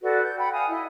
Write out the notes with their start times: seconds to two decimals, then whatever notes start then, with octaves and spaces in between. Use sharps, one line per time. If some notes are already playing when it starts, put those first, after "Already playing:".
0.02 F#4 A4 B4 D5
0.21 G6
0.37 F#5 G5 B5
0.52 F5 G#5 D#6
0.68 E4 D#5